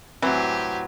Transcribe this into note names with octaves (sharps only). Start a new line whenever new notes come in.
A2 E3 F#3 C4 G4 G#5